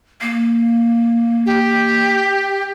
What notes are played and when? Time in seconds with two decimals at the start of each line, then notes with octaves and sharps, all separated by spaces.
0.21 A#3
1.46 G4